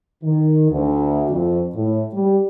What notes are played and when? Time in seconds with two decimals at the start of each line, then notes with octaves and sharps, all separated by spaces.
0.23 D#3
0.71 D2
1.31 F2
1.75 A2
2.13 G3